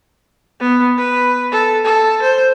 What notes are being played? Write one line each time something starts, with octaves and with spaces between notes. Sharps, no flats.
B3
B4
A4
A4
C5